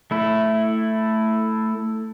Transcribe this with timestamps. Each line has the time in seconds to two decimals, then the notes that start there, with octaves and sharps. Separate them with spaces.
0.11 A3 E4